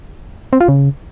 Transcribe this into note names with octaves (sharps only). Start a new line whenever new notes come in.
C4
F4
C#3